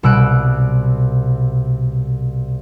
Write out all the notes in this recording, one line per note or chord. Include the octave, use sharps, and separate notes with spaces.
C2 B2 E6 F#6 D7